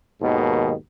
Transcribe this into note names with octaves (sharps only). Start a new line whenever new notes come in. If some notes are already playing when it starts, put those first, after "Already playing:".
D#2 G#2 B2 D#3